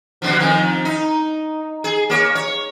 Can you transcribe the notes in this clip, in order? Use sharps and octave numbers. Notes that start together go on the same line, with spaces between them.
B2 D3 F3
F2 D#3
D#4
G#4
A#3 C#5
C#5